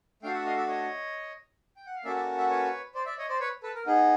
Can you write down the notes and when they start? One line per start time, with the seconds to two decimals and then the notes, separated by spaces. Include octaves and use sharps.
0.23 A3 D4 F#4 A4 F5 G5
0.34 E5 F#5
0.45 D#5 F5
0.57 D5 E5
0.68 C#5 D#5
1.77 G5
1.86 F#5
1.95 F5
2.04 A#3 C#4 F#4 A4 D5 E5
2.15 D5 E5
2.38 E5 F#5
2.50 B4 C#5
2.94 C5 D5
3.06 D5 E5
3.18 C#5 D#5
3.29 C5 D5
3.40 B4 C#5
3.63 A4 B4
3.75 A#4
3.86 B3 D#4 G#4